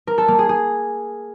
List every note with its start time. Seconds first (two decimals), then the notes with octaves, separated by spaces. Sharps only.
0.07 A#4
0.18 A4
0.28 A#3
0.39 G#4
0.49 G#4